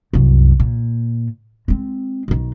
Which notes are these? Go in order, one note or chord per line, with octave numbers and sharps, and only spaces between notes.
C2 F#2
A#2
G#3 C4
B1 D#3